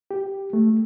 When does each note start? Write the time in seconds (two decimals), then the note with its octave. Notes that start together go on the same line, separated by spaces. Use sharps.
0.11 G4
0.53 A3